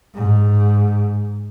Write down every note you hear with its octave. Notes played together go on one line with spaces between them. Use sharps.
G#2